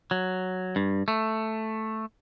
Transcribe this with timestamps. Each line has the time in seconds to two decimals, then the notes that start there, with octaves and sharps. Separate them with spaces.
0.11 F#3
0.76 G2
1.08 A3